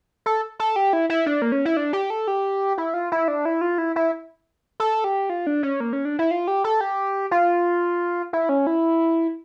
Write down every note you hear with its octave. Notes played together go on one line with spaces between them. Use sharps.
A4
A4
G4
E4
E4
D4
A#3
C#4
E4
D4
G4
A4
G4
E4
F4
E4
D4
E4
F4
E4
E4
A4
G4
F4
D4
C#4
A#3
C#4
D4
E4
F4
G4
A4
G4
F4
E4
C#4
E4